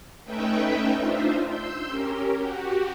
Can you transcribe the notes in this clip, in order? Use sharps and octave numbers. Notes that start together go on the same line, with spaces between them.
A3 C#4 D#4 B4 E5 G5
D4 D#4 F4 C5 E5
C6 E6 G6
C#4 G4 A#4
F#4 G4